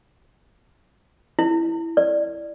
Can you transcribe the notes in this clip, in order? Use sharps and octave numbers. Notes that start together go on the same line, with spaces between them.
E4
D5